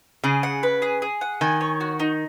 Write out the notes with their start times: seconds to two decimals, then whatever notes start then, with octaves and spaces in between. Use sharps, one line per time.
0.24 C#3 G#4
0.43 F#5
0.63 B4
0.82 G#4
1.02 G#4
1.21 F#5
1.41 D#3 G#5
1.61 C#5
1.81 F#4
2.00 D#4